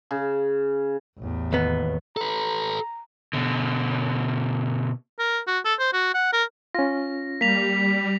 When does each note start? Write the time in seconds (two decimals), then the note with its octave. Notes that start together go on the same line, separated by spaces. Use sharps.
0.11 C#3
1.18 A1 E2
1.53 D#2 B3
2.17 A4 B4 A#5
3.33 B2 D3
5.19 A#4
5.47 F#4
5.65 A4
5.80 C5
5.93 F#4
6.14 F#5
6.33 A#4
6.75 C#4 F4 A#6
7.41 G3 A#3 B6 F7